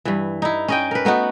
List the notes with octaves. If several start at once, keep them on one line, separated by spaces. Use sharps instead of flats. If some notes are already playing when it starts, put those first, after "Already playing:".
G2 E3
D#4 E4
C#4 D#5 G5
A#4 B4
A3 B3 D#4 F#4